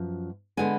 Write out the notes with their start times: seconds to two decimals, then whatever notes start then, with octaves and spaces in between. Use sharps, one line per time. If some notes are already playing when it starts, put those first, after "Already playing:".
Already playing: F#2 F3 B3
0.57 D3 G#3 B3 G#5